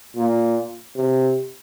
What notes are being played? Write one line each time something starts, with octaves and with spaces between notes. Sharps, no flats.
A#2
C3